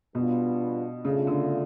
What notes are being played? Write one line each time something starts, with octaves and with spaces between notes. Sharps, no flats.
B2 G3 B3 D4 F4
C#3 A3 D4 F4
D3